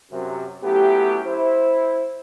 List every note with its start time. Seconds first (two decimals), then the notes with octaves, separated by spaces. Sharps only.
0.11 F#2 C3 F#3
0.63 F#3 A3 B3 C#4 E4 G4
1.25 E4 C5